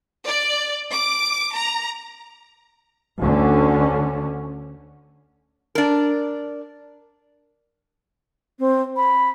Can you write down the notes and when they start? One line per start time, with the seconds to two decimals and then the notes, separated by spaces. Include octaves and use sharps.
0.23 D5
0.92 D6
1.55 A#5
3.22 D2 D3 C#4
5.75 D4 A#4
8.59 C4
8.97 B5